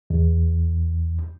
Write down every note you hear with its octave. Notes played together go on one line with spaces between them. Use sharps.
E2